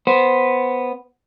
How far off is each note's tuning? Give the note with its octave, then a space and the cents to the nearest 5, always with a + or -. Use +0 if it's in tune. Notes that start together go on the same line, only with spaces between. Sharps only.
B3 +0 C5 +0